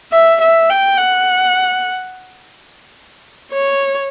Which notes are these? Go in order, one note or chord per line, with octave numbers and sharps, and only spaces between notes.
E5
E5
G5
F#5
C#5